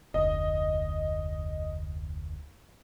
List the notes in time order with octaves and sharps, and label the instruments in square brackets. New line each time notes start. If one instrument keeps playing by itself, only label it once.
[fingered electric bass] F1 D2 [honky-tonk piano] D#5